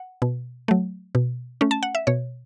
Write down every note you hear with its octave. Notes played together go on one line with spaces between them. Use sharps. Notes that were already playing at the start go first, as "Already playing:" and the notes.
Already playing: F#5
B2
F#3 A3
B2
A3 C#4
A5
F#5
E5
B2 C#5